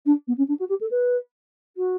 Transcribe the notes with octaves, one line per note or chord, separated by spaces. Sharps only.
D4
B3
C#4
D4
F#4
G4
A4
B4
F#4